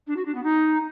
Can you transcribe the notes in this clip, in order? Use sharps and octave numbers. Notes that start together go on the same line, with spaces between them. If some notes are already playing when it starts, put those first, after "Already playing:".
D4
F#4
D4
B3
D#4